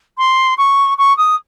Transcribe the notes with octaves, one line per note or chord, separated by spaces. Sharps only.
C6
C#6
C#6
D#6